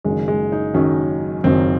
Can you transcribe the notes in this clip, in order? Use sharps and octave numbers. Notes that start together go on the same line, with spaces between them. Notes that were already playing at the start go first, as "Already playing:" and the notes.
F#1 F#2 D#3 G#3
G#3
D#4
F#1 F#2 D#3 C#4
F#1 F#2 D#3 C4